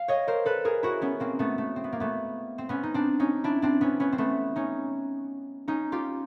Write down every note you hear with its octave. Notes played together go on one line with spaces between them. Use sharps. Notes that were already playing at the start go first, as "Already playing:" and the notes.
Already playing: F5
C#5 D#5
A#4 C5
A4 B4
G#4 A#4
E4 F#4
B3 C#4
A#3 C4
A3 B3
A3
C4
B3
A#3
A3 B3
C4
B3 C#4
D#4
C4 D4
C#4 D#4
D4 E4
C4 D4
B3 C#4
B3 C#4
C4
A3 B3
C#4 D#4
C#4 D#4
F4 G4